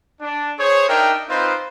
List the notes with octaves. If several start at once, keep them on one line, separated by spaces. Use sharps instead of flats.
D4
G#4 C5 C#5
D4 D#4 A#4 E5 G5
C4 D#4 F4 B4 C5